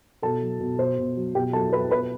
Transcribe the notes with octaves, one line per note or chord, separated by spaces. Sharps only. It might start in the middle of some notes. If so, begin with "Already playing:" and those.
B2 A4 A5
F#3
B2
B2 C5
B2
F#3
B2 G4 G5
F#3 A4 A5
F#3 B4 B5
B2 B4 B5